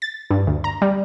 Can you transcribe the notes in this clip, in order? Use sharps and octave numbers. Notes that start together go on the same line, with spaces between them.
A6
G2
D2
A#5
G3